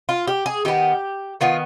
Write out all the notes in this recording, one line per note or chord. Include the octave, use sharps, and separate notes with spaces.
F4
G4
G#4
D#3 B3 G4
D#3 B3 F4